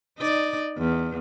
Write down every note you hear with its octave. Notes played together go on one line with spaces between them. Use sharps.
D#4 D5
E2